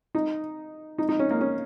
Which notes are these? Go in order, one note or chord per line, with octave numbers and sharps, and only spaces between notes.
D#4
D#4
D#4
C#4
A#3
C#4